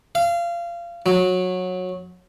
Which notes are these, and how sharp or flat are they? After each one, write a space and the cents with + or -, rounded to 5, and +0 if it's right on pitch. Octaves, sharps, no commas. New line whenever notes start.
F5 -25
F#3 -20